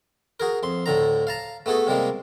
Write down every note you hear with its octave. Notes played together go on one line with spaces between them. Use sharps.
F#4 G#4 A#4
F2 C6
D2 A2 D3 A#5
F5 A5 A#5
A3 B3 F#4 G#4 A4
C3 G3 G#3 A#3